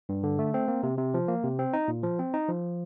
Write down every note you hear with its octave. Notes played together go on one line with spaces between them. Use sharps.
G2
D3
A3
C4
A#3
C3
C3
F3
A#3
C3
C4
D#4
A#2
F3
C4
D#4
F3